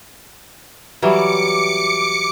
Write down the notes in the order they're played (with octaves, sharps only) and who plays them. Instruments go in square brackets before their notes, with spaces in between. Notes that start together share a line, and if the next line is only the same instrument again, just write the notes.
[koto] E3 F#3 G3 [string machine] D6 C#7